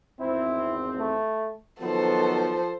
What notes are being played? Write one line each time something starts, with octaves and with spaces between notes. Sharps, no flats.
G#1 E2 C4 E4
A3
D#3 F3 F#3 B3 A4 C5